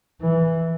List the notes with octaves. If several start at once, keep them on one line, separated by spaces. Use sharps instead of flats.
E3